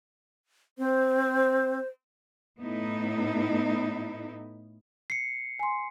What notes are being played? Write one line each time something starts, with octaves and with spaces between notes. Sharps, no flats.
C4 C5
A2 B3 D#4 E4
C7 C#7
G#5 C6